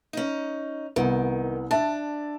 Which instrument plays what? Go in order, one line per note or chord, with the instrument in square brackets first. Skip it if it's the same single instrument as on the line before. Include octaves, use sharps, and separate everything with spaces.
[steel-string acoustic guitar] C#4 D#4
[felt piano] C2 B3 [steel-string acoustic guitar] D#3
[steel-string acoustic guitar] D4 [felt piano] E5 A5